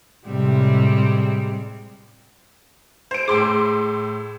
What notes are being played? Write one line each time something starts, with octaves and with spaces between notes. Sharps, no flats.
A2 C3 G3 G#3 C4
C5 D7
A2 G#4 C6 D6